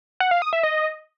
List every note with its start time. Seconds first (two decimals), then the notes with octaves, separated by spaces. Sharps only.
0.20 F#5
0.31 F5
0.42 D#6
0.53 E5
0.63 D#5